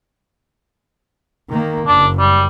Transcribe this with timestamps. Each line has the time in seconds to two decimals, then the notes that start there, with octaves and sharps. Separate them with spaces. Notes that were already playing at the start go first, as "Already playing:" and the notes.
1.50 D#3 A#3
1.87 F#1 F#2 D4
2.19 G3